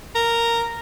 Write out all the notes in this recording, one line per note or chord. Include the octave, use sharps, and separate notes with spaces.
A#4